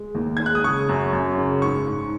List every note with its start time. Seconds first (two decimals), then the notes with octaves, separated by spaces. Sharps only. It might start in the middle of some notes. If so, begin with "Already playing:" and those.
Already playing: G#3
0.15 D#2
0.37 G#3 G#6
0.46 F#6
0.55 D#6
0.64 C#3 C#6
0.89 F#2
1.13 F#2
1.37 C#3
1.62 G#2 C#6
1.87 G#2